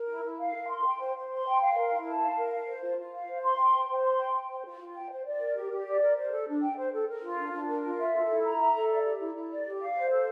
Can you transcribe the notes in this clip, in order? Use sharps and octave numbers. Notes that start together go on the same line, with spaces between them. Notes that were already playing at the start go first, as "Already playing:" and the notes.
Already playing: A#4
E4
E4
F5
A#4
C6
G5
C5
C5
C6
G5
F5
A#4
E4
A5
F5
A#4
F5
C5
F4
F4
F5
C5
C6
G5
C5
C5
C6
G5
G5
C5
F4
F4
G5
C5
D5
A#4
G4
G4
D5
A#4
C5
A4
D4
G5
C5
A4
A#4
F4
D4
D4
A#4
F4
E5
A4
E4
A#5
E5
A4
D5
G4
E4
E4
D5
G4
F5
C5
A4